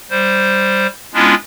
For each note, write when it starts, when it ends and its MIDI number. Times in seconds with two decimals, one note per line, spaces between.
0.10 0.87 55
0.10 0.87 72
1.14 1.34 56
1.14 1.34 59
1.14 1.34 61
1.14 1.34 62
1.14 1.34 64
1.14 1.34 65